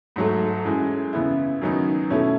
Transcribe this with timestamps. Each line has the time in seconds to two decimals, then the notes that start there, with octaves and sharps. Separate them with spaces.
0.16 G#2 F#3 A3
0.65 F#2 E3 G#3
1.13 C#3 E3 B3 E4
1.61 F#2 D#3 F#3 B3 D#4
2.10 B2 A3 C#4 E4